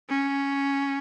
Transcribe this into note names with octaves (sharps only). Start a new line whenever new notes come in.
C#4